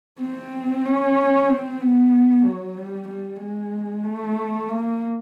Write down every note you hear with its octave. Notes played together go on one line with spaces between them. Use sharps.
C4
C#4
C4
B3
F#3
G3
G3
G#3
A3
A#3